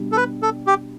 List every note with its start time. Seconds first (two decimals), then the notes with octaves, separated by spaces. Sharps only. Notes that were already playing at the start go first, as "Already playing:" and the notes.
Already playing: B2 G3 D4
0.12 A4
0.17 B4
0.42 A4
0.67 G4